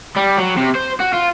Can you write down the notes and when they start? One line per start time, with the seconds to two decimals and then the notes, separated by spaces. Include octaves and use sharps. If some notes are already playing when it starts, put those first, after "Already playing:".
0.17 G3
0.38 F#3
0.57 C3
0.75 C5
1.00 F#4
1.13 F4